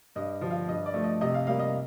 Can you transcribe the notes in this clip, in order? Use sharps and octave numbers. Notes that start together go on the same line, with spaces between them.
G2 D#5
D3 F3
F5
G2 D#5
D5
F3 A3
D#5
C3 D#5
F5
G3 A#3 F5
D#5